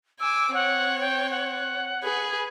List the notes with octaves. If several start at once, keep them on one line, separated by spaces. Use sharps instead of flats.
G#5 D6 E6
C4 C#5 F#5
G5
F#5
G#4 B4